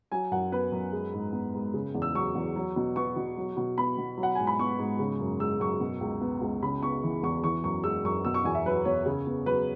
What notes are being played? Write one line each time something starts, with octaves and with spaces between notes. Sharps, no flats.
F#3 G#5
F#2 F#5
B3 B4
F#2
G#3
G#2
B3
G#2
C#3
E2
E6
F#3 C#6
E2
F#3
B2
B3 C#6
B2
F#3
B2
B3 B5
B2
F#3
F#5
G#2 G#5
B5
B3 C#6
G#2
C#3
F#2
G#3 E6
F#2 C#6
B2
C#2
B3
C#2
C#3 B5
B3 C#6
E3
E2 C#6
E3 C#6
F#2 C#6
G#3 E6
F#2 C#6
B2 E6
C#6
E2 G#5
E5
F#3 B4
E2 C#5
C#3
B3
F#3 B4